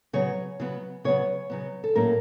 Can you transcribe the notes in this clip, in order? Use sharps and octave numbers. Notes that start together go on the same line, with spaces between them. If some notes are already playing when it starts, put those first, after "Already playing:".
C#3 F#3 B3 C#5
C#3 F#3 B3
C#3 F#3 B3 C#5
C#3 F#3 B3
A4
A2 F#3 A#3 C#4 A#4